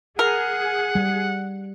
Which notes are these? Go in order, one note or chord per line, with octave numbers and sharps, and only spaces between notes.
G#4 A#4 F#5
G3